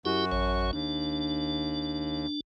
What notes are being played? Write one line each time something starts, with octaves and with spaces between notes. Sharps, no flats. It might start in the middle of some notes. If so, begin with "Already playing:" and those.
F#2 E4 F#4 G4
A1 C#5
D#2 D4